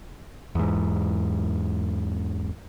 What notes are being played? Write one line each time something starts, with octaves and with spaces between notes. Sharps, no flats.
E2 G#2